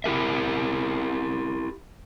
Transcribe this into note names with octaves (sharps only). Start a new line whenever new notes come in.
E4 G4 A#4 E5